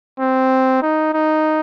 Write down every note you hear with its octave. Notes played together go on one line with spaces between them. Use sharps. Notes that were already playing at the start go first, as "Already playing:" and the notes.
C4
D#4
D#4